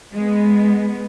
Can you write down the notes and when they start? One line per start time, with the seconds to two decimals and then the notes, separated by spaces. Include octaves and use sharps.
0.14 G#3 B3